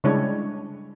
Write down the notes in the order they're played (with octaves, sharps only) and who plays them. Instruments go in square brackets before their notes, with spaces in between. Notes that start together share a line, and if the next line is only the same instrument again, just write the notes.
[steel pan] C#3 G3 G#3 D4 E4 C#5